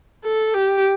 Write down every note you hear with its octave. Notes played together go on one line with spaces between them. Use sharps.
A4
G4